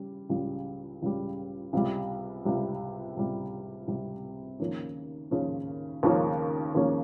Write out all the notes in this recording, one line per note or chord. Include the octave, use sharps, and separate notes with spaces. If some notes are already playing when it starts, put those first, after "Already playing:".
Already playing: C#3 G3
C#2 C#3 G3
C#2 C#3 G3
C#2 C3 G3
C#2 C3 G3
C#2 C3 G3
C#2 C3 G3
D#2 C#3 F3 A#3 C#4
D#2 C#3 F3 A#3 C#4
D#2 C#3 F3 A#3 C#4
D#2 C#3 F3 A#3 C#4